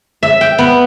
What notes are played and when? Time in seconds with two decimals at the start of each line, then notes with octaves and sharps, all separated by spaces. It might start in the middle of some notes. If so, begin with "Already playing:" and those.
0.23 E5
0.41 G5
0.58 B3